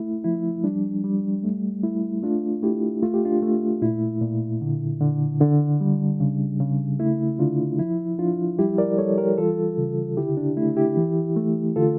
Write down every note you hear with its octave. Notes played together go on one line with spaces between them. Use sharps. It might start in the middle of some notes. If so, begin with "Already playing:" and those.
Already playing: A3 E4
F3 E4
G3 D4
G3
A3
A3 E4
A3 D4 F4
A3 E4 G4
A3 F4
G4
D4 F4
A3
A#2 E4
A#2
D3
D3
D3 D4
G3
C#3
C#3
A3 E4
D3 D4 F4
F3 E4
F3 D4 F4
G3 E4 G4
A#4 D5
G3 A4 C#5
G4 A#4
E3 F4 A4
C#3
D3 E4 G4
D4
A3 E4
E4 G4
E3
A3
D3 F4 A4